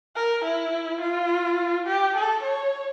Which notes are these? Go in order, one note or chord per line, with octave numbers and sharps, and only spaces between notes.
A#4
E4
F4
G4
A4
C#5